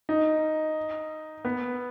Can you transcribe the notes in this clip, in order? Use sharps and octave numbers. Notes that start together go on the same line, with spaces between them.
D#4
B3